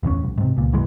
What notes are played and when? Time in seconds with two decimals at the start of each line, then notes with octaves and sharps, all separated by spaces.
0.03 E1 A1 C4 C#4
0.23 B1
0.38 G#2 C3
0.57 C#2 A#2
0.72 C2 G2 E3 G#3